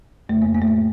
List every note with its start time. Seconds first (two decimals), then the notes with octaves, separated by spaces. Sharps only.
0.29 F2 C#3 A3
0.42 A#3
0.55 A#3
0.62 A3
0.68 A2 A#3